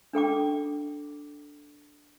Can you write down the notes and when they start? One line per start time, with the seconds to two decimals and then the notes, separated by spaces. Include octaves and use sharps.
0.13 D4 A4 G5 D6